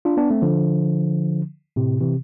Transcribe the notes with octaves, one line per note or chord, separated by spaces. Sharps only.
D4 F4
B3 D4
A3 C4
D3 F3
A2 C3
C3 E3